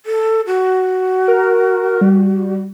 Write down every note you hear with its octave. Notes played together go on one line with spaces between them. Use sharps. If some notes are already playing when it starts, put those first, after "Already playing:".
A4
F#4
A#4
G3